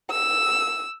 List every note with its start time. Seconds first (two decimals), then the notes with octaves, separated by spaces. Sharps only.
0.11 E6